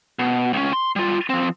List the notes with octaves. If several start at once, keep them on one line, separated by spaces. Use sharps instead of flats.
B2
C#2 C#4
C6
G3 F4
F3 C4